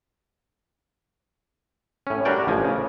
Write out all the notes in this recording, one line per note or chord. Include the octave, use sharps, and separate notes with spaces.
A2 C#4
G3 D4 F#4 A#4 D5 G5
A1 F3 G#5
C#3